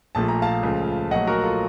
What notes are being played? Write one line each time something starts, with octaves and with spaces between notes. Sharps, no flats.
A#1 A#2 F3 A3 A5
A#5
F5 A5
C#2 C#3 F3 A3
A#1 A#2 F#3 A3 D#5 F#5
F#4 A#4
F4 A4